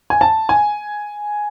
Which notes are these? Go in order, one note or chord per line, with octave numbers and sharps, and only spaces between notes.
G#5
A5
G#5